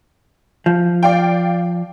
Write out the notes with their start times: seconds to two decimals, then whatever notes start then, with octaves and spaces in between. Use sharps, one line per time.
0.66 F3
1.03 D5 F5 G5